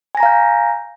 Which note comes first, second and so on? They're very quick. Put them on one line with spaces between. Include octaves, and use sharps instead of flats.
G#5 A#6 A#5 F5 G6